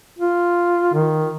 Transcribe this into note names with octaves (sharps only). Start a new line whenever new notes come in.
F4
D#3